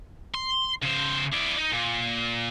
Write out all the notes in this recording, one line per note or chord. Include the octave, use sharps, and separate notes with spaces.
C6
C#3 C5
E4 D5
D#4
A#2